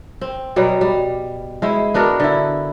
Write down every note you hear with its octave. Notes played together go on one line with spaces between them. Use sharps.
C4
B2 F#3 G3
G3
G#3 E4 C5
B3 D4 F#4 A#4
D3 E4